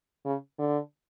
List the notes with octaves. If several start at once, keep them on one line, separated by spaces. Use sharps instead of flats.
C#3
D3